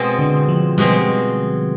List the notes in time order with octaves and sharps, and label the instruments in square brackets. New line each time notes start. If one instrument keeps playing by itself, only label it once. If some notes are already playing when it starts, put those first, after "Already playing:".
Already playing: [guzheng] B2 G#3 C4
[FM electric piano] D3
F3
[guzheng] B2 G#3 C4 [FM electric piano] G3